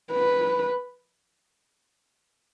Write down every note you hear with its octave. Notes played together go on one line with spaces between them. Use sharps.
B4